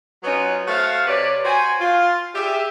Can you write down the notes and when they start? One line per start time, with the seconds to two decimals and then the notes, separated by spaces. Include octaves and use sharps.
0.24 F#3 B3 C#4 D#4 F4 F#4
0.68 A3 F#4 C5 E5 F5
1.07 C3 B4 C#5 D5
1.45 F#4 C5 G5 G#5
1.81 F4
2.35 G4 G#4 E5